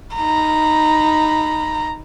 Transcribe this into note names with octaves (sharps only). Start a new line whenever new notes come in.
D#4 A#5 B5